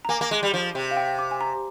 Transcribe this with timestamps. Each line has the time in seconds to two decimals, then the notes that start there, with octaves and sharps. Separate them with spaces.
0.05 A#5
0.09 A#3 G#5
0.21 A#3
0.31 G#3
0.43 G3
0.54 F3
0.75 C3
0.91 F5
0.97 G5
1.19 D6
1.31 G#5
1.41 A#5